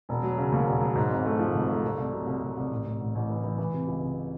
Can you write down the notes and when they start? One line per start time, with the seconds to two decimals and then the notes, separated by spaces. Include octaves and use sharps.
0.09 E1
0.23 F#3
0.38 C#3
0.52 D#2
0.67 E1
0.81 F#3
0.95 G#2
1.10 G#1
1.25 A3
1.39 F3
1.54 G#1
1.68 A3
1.84 C2
1.98 C2
2.12 F#3
2.27 C2
2.42 C2
2.57 C2
2.71 A1
2.85 A1
3.01 A1
3.15 A1
3.29 E3
3.44 E3
3.58 E3
3.73 C3
3.88 C#2
4.02 C3